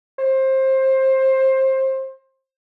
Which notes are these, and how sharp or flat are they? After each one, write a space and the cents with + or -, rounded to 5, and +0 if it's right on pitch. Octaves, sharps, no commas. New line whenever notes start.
C5 +20